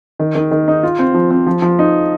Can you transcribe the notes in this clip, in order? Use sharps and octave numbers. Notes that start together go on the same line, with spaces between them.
D#3
D#3
D#3
D#4
F4
C4
F3
C4
F3
F3
D#4